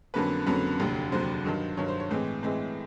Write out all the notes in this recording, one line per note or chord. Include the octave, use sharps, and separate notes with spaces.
F2 D3 F#3 A#3 C#4 B4
F2 D3 F#3 A#3 C#4 B4
F1 D#2 D3 F#3
F1 D#2 D3 F#3 C5
G2 D#3 F#3
G2 D#3 F#3 C#5
C5
C#5
A2 E3 G#3 C4
A2 E3 G#3 C4